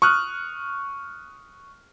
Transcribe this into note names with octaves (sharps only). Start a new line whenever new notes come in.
C#6 D#6 F6 F#6